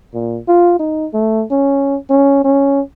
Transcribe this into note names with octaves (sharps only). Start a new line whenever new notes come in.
A#2
F4
D#4
A3
C#4
C#4
C#4